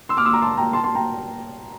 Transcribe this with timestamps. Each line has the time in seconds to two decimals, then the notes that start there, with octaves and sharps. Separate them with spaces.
0.09 C6 E6
0.17 D6 F6
0.25 C6 E6
0.33 A#5 D6
0.42 A5 C6
0.57 G5 A#5
0.73 A5 C6
0.84 A5 C6
0.95 G5 A#5